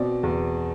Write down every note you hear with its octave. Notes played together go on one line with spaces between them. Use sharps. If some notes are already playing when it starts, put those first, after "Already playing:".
Already playing: B2 C4 D5
E2